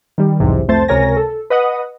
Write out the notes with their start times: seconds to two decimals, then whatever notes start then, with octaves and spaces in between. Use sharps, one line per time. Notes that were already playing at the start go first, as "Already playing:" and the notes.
0.18 D#3 G3
0.40 B1 E2 G#2 C3
0.68 C2 F2 A3 C5 A5 A6
0.88 C#2 C3 A#4 C#5 G#5 A#6
1.17 A4
1.50 B4 D#5 F#5 D#6